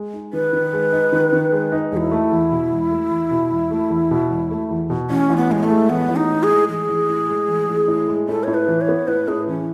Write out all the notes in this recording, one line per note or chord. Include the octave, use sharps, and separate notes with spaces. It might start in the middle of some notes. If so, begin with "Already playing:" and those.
Already playing: G#3
D#4
D#3 B4
D#3
G#3
D#4
D#3
D#3
G#3
D#4
E1 E4 G#4
A3
E2
B2
E1
A3
E2
B2
E1
A3
E2
B2
E1
A3
E2
B2
A1 C#4
A1
B3
A2 G#3
A3
G#3
A1 B3
A1
D#4
A2
G#4
G#3
A1 G#4
A1
A2
G#3
A1
A1
A2
G#3
A2 A4
A2 C#5
B4
E3
C#5
B3
A2 B4
A2 G#4
E3 C#4